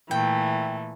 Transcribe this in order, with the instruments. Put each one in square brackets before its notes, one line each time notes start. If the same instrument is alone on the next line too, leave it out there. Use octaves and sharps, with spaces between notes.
[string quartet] A#2 E3 A3 [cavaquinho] G5